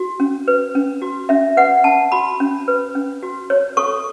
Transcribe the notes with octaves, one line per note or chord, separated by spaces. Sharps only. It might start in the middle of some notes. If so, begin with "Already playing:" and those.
Already playing: F#4
C#4
B4
C#4
F#4
C#4 E5
B4 F#5
C#4 A5
F#4 B5
C#4
B4
C#4
F#4
C#5
A4 C#6